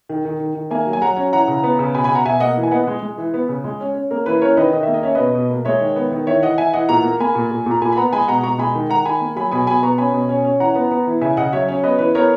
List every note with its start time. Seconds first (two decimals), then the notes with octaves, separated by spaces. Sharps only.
0.09 D#3
0.25 D#3
0.40 D#3
0.55 D#3
0.71 A#3 E5 G#5
0.87 F#3
0.93 G#5
1.02 F#3 F#5 A#5
1.17 C#4
1.32 E3 F#5 A#5
1.48 C#3
1.63 B3
1.79 C#3
1.94 B2 G#5 B5
2.04 G#5 B5
2.10 B2
2.15 F#5 A#5
2.25 B2 E5 G#5
2.40 A#3 D#5 F#5
2.57 E3
2.63 G#5
2.71 B3 D#5 F#5
2.87 G#3
3.02 G#3
3.18 E3
3.34 B3
3.49 C#3
3.64 G#3
3.80 C#4
3.95 C#4
4.11 A#3 A#4
4.26 E3 B4
4.42 C#4 A#4 C#5
4.57 D#3 B4 D#5
4.73 D#3 D#5
4.83 A#3 E5
4.94 D#5
5.03 C#4 E5
5.15 B2 B4 D#5
5.34 B2
5.50 A#3
5.65 G#3 C#5 E5
5.81 D#3
5.96 B3
6.11 D#3
6.27 E3 C#5 E5
6.42 E3 D#5 F#5
6.58 E3 E5 G#5
6.73 E3 D#5 F#5
6.89 A#2 F#5 A#5
7.04 A#3
7.20 A#3 G#5 B5
7.35 A#2
7.51 A#2
7.66 A#2 A#5
7.81 A#2 G#5 B5
7.92 B5
7.97 B3 F#5 A#5
8.13 G#3 G#5 B5
8.28 B2 F#5 A#5
8.43 B2 A#5 C#6
8.58 G#3 G#5 B5
8.75 D#3
8.90 D#3 F#5 A#5
9.05 D#3 G#5 B5
9.21 A#3
9.36 F#3 G#5 B5
9.51 B2 G#5 B5
9.67 B2 G#5 B5
9.82 B3 A#5 C#6
9.98 C#4 G#5 B5
10.14 B2
10.29 C#4
10.45 C#4
10.60 E3 F#5 A#5
10.75 B3
10.91 B3
11.07 E3
11.21 C#3 E5 G#5
11.37 C#3 D#5 F#5
11.52 F#3 C#5 E5
11.68 C#4
11.83 B3 B4 D#5
11.99 E3 B4
12.15 B3 A#4 C#5